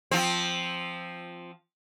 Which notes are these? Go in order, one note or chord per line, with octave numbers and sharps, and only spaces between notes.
F3 C4